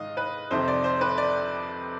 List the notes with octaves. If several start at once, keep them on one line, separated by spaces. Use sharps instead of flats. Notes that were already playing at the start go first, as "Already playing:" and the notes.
Already playing: G#2 D#3 D#5 F5
B4
F2 C3 D#3 C5
D5
C5
B4
D5